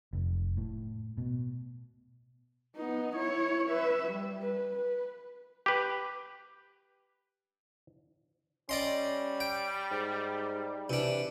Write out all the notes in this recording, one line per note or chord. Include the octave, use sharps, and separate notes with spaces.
F1
A2
B2
B3 D#4
E4 C#5
B4 E5
G3
B4
B4
G4 B4
G3 C#4 D5 D#5 C6
G5
G#2
C3 E3 D4